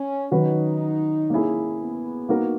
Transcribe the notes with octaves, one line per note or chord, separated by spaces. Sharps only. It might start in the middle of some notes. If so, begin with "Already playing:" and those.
Already playing: C#4
D#3 F#3 C#4 D#4 F#4 B4
A#3 C#4 E4 G#4
B3
A#3 D#4 F#4 A#4